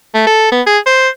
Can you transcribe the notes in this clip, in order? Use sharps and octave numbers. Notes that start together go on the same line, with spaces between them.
A3
A4
B3
G#4
C5